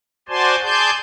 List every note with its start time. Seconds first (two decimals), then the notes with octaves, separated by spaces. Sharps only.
0.29 F#4 C5 D5 G#5 A5 C6
0.63 G#4 D5 G#5 A5 C6 G6